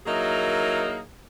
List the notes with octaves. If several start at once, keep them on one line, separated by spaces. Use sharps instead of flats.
F#3 A#3 D#4 E4 G#4 A#4